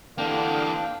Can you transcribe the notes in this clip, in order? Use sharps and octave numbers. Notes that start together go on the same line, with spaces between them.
D3 E3 A#3 D4 F5 G5